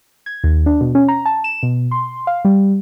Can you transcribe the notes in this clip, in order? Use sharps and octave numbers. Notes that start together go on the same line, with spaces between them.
G#6
D#2
D4
B2
C#4
A#5
A5
E7
B2
C6
F5
G3